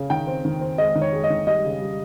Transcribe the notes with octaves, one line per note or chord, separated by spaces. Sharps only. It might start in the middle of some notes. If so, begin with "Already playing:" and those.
Already playing: C#3
D#3 G5
C4
D#3
C4
G#3 D#5
D#3
C#5
G#3
D#5
D#3
G3 D#5
C#3
G3